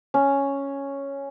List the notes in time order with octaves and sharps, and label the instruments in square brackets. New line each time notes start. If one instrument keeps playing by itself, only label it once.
[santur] C#4